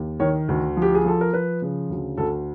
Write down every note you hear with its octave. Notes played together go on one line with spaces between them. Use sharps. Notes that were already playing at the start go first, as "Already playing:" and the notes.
Already playing: D#2
D#3 C#5
D2
F3
G4
G#4
F3 A4
A#4
F3 B4
C#3
D2
D2 A4